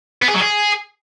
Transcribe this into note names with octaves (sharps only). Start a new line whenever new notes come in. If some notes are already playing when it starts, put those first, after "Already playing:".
B3
G#4
F#3
G#4